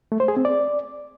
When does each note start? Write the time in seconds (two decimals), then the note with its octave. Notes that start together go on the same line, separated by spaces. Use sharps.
0.12 A3
0.20 C5
0.28 G#4
0.37 C4
0.45 D5